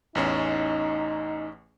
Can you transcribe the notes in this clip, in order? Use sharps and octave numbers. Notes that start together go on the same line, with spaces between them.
A1 E2 C#4 D#4